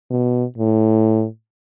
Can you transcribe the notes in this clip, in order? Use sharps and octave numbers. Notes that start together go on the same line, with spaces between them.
B2
A2